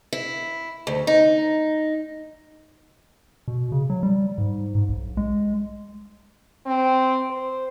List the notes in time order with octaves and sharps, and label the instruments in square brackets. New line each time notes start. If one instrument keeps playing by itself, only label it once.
[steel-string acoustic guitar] E4
D2
D#4
[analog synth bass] B2
C#3
F#3
G3
G#2
G#2
B1
G#3
[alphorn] C4
C5